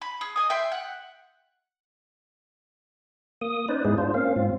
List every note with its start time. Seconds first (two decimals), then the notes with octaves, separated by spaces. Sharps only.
0.02 B5
0.21 G#4
0.36 D#5 G#5 D#6
0.50 E5 G5 C6
0.72 F#5
3.41 A#3 D#6
3.68 C#4 D#4 B4 C5 D5
3.85 G#2 G#3 B3 D#4 E4 G#4
3.98 D4 F4 C5
4.14 A#3 C4 C#4 F5
4.36 G#2 C4 F4